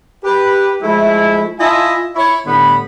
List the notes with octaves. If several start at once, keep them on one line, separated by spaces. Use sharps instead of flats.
G4 B4
F3 G#3 A3 E4
E4 F4 D#5 E5 G#5 A5
E4 C#5
A2 D3 G3 B3 B5